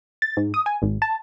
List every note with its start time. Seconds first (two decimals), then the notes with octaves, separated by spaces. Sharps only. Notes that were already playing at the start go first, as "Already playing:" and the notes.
0.22 A6
0.37 G#2
0.54 D#6
0.66 G#5
0.82 G#1
1.02 A5